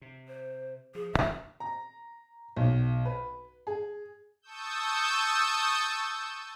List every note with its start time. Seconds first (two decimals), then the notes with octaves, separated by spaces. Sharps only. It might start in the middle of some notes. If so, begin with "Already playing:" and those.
0.02 C3
0.28 C5
0.95 F3 G#4
1.13 E1 A1 E2 E5
1.60 A#5
2.56 B1
3.05 B4
3.67 G#4
4.42 A5 C#6 D#6 E6 G6